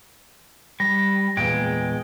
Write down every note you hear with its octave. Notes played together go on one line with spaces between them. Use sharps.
G3 A#6
E2 A#2 G#3 G5